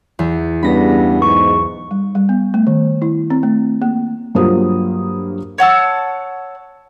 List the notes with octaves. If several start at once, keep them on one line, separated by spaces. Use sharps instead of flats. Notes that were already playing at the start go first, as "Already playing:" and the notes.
E2
G2 C#3 G3 B3 B5 A#6
B1 G#2 C#6
G3
G3
B3
A3
D#3
E4
C4
A3
A#3
G2 F#3 A#3 F4 C5 D#6
C#5 F#5 A5 E6